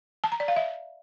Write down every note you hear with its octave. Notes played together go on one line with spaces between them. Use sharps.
A5
A#5
D5
F5
E5